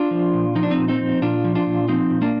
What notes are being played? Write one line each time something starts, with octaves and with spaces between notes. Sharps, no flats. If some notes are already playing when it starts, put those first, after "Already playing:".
Already playing: D4 F4
F3
A#2
F3 D#4
D4
C4 D#4
A#2
C4 D#4
F3
A#2 D4 F4
F3
D4 F4
A#2
F3 C4 D#4
A#2
A#3 D4